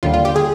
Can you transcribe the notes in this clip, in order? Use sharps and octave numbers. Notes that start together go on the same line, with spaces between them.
D#2 D3 G3 F4
F4
G4
G#4